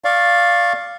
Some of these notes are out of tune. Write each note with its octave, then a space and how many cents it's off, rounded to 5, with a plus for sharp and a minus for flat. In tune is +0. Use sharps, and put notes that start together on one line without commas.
D5 +0 F5 +0 C#6 -25